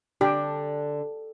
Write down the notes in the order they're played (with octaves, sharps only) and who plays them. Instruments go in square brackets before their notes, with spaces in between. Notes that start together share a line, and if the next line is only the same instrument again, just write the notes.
[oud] D3 [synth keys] D4 [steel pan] G4